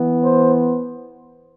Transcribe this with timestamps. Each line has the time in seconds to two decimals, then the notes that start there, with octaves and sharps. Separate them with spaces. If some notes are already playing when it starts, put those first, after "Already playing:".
Already playing: E3 B3
0.22 C5